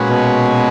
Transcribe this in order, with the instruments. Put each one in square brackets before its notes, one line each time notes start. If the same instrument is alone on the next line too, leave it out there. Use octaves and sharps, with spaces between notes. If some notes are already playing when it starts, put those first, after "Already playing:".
Already playing: [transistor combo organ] A#2 G#3 C#4 F#4 B4
[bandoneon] B2